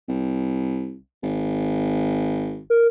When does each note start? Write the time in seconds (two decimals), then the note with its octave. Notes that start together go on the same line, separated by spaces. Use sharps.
0.08 C2
1.23 G#1
2.70 A#4